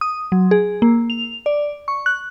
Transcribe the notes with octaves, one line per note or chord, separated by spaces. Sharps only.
D#6
F#3
G#4
A#3
F7
D5
C#6
F#6